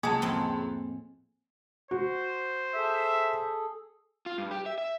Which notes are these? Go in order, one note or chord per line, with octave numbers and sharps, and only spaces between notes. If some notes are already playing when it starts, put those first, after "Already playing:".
C#2 F#3 A#3 G#4 G#5 A5
F2 A2 C4
F#4 C5
G#4 A4 E5
F4
G2
G4
E5
E5